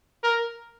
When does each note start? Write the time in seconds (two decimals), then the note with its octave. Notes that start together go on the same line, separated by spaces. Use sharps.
0.23 A#4